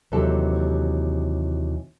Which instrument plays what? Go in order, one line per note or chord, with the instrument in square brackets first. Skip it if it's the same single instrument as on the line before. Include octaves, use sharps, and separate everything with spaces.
[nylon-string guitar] D#2 C3 E3 F#3 G4 A4